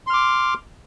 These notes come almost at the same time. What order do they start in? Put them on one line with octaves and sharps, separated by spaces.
C6 F6 D6